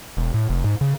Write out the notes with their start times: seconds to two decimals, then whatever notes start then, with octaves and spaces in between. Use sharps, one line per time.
0.17 E1
0.34 A2
0.49 F1
0.64 G#2
0.81 C#3